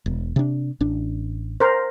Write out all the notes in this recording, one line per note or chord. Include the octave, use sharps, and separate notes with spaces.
E1
C3 D4
A1 D4
A#4 C5